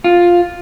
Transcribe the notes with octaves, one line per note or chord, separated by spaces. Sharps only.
F4